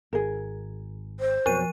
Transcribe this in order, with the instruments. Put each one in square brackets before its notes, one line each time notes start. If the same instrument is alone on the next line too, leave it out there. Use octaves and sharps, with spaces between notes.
[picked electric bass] G#1 [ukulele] G#4 A#4
[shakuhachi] C5
[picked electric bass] F2 B2 F#3 [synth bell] F3 D#7